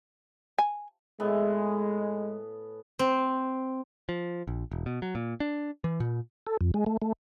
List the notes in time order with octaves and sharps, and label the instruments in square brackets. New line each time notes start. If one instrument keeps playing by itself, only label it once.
[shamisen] G#5
[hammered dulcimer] A2 B3 G#5 [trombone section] G#3
[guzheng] C4
[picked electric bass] F3
A#1
E1
B2
F#3
A#2
D4
E3
A#2
[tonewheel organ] A4
F2
G#3
A3
A3